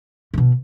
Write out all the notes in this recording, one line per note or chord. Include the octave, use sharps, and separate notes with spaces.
A2
B2